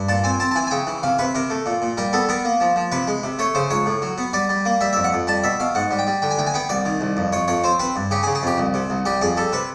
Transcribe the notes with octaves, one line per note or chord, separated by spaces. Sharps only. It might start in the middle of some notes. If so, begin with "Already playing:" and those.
Already playing: G2
A#2 A5
C4 G#5
C4 A5
A5
E3 G#5
G#5
C#3 G5
E3
C3 F5
C3 B4
C3 A#4
A3
A#2
A#2
G3 A#4
B3 A4
B3 A#4
A#3
F3
F3
C3 B4
G#3
C3
A3 C#5
C#3 C5
C#2 C#5
A2
F#3
B3
G3 D5
G3
A#3
G3 E5
F2 E5
F#5
F2
G3 A5
B2 E5
B2 F5
G#2 F#5
G3
G5
G3
D3 G5
G#5
D2 G5
G#5
B3 G5
C2 D5
D#3
C2
F2
F2 C#5
F2 C#5
C4 C5
C4 B4
G2
C#3 G4
G#4
C#3
G#4
F2 G4
C2
C3
C2
G3 G4
F2 G#4
G3 A4
C3 B4